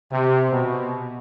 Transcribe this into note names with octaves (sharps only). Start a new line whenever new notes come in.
C3
B2